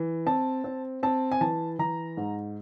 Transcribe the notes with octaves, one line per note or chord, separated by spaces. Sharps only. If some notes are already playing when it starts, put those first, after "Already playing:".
Already playing: E3
C4 A5
C4
C4 A5
G#5
E3 A5
E3 A#5
G#2